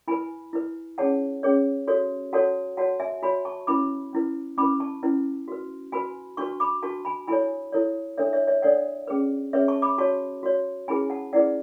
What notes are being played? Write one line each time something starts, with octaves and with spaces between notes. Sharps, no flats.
E4 B4 G#5 B5
E4 B4
C#4 G#4 C#5 F#5 A5
C#4 G#4 C#5
F#4 A4 C#5
F#4 A4 C#5 F#5 A5
F#4 C#5 F#5 A5
E5 G#5
F#4 C#5 G#5 B5
A5 C#6
C#4 E4 B4 B5 D6
C#4 E4 B4
C#4 E4 B4 B5 D6
A5 C#6
C#4 E4 B4
F#4 B4
F#4 B4 G#5 B5
D4 F#4 B4 A5 C#6
B5 D6
D4 F#4 B4 A5 C#6
G#5 B5
E4 A4 C#5 G#5 B5
E4 A4 C#5
D4 A4 C#5 E5
C#5 E5
C#5 E5
D4 A4 C#5 D5 F#5
C#4 G#4 B4
C#4 G#4 B4 C#5 E5
A5 C#6
B5 D6
F#4 C#5 A5 C#6
F#4 C#5
C#4 E4 G#4 B4 G#5 B5
F#5 A5
C#4 E4 G#4 B4 D5 F#5